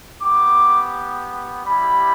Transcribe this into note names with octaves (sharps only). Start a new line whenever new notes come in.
B3 G4 D6
G3 E4 G4 B5